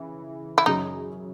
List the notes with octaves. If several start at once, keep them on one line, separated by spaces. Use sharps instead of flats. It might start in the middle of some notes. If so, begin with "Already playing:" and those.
Already playing: C#3 E3
E4
F#2 C#3 F#3 C#4 D#4 G#4